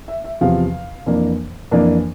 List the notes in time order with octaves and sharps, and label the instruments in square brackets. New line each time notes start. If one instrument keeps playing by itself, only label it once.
[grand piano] E5
E5
E2 C3 F3 F5
F2 E3 A#3 D4
F2 E3 A#3 D4